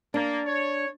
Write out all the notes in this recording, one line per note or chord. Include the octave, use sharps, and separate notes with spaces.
A#3 D4
C#5